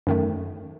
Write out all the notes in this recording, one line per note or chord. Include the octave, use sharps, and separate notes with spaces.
F#2 D#3 A3